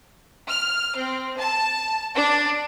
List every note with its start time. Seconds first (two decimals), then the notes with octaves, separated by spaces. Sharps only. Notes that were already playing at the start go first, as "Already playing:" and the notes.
0.49 F6
0.95 C4
1.40 A5
2.15 D4